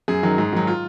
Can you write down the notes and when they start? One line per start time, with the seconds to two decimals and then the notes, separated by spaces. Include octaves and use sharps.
0.08 F#2 G#4
0.23 D#3 F#3
0.38 G#2
0.53 D#3 F#3
0.67 F4